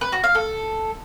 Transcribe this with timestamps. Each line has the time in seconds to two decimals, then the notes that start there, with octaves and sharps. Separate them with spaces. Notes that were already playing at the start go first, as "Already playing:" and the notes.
0.01 B4
0.12 F#4
0.24 F5
0.35 A4